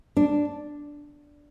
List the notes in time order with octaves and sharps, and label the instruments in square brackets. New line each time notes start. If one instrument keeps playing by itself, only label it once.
[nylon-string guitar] D4